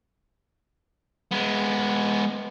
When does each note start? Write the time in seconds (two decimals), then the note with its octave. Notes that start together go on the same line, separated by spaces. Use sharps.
1.32 G#3 B3